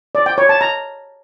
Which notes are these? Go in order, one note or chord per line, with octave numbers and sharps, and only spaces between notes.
D5
G5
C#5
A5
A#5